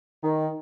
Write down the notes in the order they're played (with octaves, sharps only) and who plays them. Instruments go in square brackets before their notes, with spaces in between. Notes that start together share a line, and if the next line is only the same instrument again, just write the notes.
[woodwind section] D#3